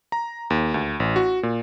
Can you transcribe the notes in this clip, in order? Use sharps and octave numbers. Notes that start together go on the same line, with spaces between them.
A#5
D#2
D2
A1
F#4
A#2